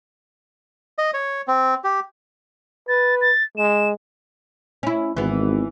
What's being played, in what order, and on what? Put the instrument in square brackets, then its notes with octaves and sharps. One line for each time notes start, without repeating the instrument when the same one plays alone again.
[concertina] D#5
C#5
C4
G4
[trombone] B4 [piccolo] A6
[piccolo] A6
[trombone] G#3 [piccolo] E7
[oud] C#4 E4
[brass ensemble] G#1 [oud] E3 B3